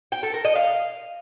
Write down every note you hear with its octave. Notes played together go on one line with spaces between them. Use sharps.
G5
A4
A#4
D#5
F5